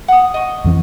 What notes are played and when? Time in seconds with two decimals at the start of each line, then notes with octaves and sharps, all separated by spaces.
0.08 F#5 D#6
0.34 D#5 C#6
0.64 F2 E3 C4